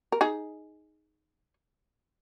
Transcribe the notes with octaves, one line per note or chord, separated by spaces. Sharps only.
A#4
D#4 G#4